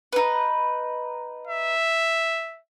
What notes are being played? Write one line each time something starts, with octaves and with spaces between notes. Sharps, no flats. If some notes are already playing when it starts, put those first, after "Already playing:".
D#4 B4
E5